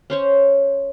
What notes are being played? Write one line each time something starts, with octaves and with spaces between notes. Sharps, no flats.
C#4 C5 C#5